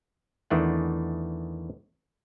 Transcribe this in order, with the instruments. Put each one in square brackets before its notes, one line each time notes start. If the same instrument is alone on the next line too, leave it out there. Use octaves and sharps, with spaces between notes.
[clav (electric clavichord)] E2 D#3 E3 A3 D4 F#5